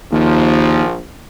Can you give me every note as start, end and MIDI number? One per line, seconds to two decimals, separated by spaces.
0.12 0.99 34
0.12 0.83 39
0.12 0.99 53